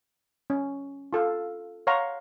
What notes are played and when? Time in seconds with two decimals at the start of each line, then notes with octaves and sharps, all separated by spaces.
0.50 C#4
1.13 F4 A4 F5
1.87 C#5 F5 F#5 A#5 C6 C#6